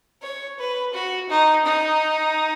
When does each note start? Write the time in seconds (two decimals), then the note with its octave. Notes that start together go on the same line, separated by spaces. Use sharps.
0.22 C#5
0.59 B4
0.93 F#4
1.29 D#4
1.65 D#4